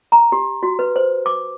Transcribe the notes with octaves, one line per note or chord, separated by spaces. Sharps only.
A#5
G4
F#4
B4
C5
D6